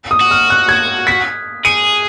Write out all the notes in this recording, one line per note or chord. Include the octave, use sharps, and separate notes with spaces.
D#6
F#4
F6
F#6
G#6
B6
G#4 D#7